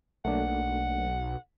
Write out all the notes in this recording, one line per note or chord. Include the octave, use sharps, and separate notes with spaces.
B1 A3 A#3 D4 F#5